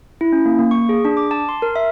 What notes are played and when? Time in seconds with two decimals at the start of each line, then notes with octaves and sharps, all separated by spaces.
0.21 E4
0.32 C#4
0.46 A#3
0.59 A#3
0.71 C#6
0.89 G#4
1.05 D4
1.17 D6
1.31 A5
1.49 C6
1.62 A#4
1.76 E5